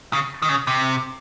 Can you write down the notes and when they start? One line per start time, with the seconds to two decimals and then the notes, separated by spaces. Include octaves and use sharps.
0.13 C#3
0.42 D#3
0.49 C#3
0.67 C3